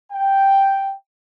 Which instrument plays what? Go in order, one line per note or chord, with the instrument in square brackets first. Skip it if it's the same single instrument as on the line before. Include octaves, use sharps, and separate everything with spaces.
[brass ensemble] G5